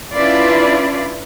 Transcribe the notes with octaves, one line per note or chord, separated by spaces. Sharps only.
C#4 D4 E4 F4 B4 D5